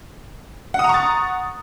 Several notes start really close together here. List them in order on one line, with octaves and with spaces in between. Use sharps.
F#5 D#6 A#5 C#6 A6